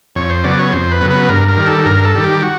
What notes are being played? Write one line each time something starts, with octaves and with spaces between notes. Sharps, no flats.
F2 C#5
C5
C#3 F#3 B3 D5
C#5
F2 C5
B4
C#3 F#3 B3
B4
G2 A#4
A#4
D#3 G3
A4
G2 A#4
A4
D#3 G3
G4
F#4